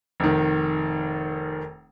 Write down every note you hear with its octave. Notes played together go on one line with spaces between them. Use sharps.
F1 D#3